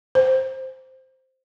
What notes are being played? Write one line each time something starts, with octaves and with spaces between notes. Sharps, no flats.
C5